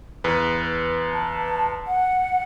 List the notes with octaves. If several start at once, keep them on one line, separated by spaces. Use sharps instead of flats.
E2 B4
A5
F#5